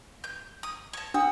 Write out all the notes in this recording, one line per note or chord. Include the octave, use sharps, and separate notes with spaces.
G6
D#6
C#5 A5
D4 F#5 D#6 E6